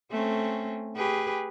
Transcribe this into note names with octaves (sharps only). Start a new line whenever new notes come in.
A3 C4 C#4
G4 G#4 B4